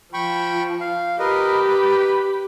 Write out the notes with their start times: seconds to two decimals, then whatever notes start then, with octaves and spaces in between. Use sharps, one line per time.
0.14 F3 G5 B5 C#6
0.81 F5
1.19 G4 A#4 B4 D#5 B5
1.68 B4